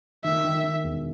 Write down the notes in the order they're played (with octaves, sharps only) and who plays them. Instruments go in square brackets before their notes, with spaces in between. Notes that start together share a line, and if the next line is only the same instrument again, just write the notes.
[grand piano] D#3 [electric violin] E5
[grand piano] D#3
D#3
E1